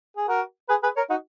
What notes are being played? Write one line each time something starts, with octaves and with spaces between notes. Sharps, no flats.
G#4
F#4 A#4
G#4 B4
G#4 B4
A#4 C#5
D#4 F#4